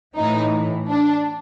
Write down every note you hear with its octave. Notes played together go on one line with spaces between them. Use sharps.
A2 E3 D#4
D4